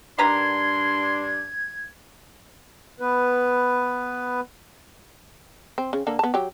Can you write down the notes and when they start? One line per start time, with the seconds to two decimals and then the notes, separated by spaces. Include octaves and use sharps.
0.19 G2 D#3 G3 D4 B4 A#5 C6 G#6
3.00 B3 B4
5.78 C4
5.93 C#3
6.07 D3 A#3 A4
6.19 B3 A5
6.34 F#3 G4